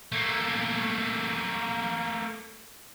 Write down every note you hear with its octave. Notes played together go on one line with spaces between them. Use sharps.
A3 A#3